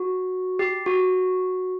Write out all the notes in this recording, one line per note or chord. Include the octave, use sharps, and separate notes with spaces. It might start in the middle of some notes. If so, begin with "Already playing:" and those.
Already playing: F#4
G4
F#4